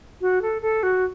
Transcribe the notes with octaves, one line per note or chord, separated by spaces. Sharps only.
F#4
A4
A4
F#4